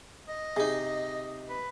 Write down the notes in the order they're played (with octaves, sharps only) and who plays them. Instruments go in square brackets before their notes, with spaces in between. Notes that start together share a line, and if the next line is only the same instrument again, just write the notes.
[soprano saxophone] D#5
[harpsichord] C3 D#4 [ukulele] G#4
[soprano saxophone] B4